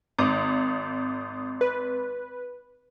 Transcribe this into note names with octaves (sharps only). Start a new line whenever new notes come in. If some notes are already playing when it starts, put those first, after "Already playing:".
G#1 D6 D#6 G6
B4